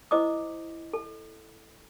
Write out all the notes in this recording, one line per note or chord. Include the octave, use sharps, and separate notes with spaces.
E4 C5 D#5 D6 D#6
A4